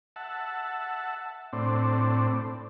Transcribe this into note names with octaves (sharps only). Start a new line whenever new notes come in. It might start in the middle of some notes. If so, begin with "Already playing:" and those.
E5 F#5 A5
A2 C4 D4